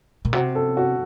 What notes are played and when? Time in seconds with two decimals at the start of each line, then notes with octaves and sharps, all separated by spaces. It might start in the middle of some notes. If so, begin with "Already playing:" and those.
0.25 A#2
0.33 C3 F#4
0.55 A4
0.77 F#4